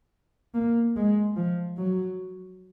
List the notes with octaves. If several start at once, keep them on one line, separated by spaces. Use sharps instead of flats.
A#3
G#3
F3
F#3